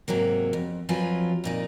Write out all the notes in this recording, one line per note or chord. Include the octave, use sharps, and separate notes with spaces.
G#2 C3 F#3 A#3
F2
F2 F3 F#3 F4 B4 G#5
F2 A#2 D#4